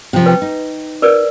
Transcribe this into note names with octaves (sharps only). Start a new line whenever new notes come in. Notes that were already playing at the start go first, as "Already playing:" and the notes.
C3 F3
B4 G5
D#4
A#4 B4 D5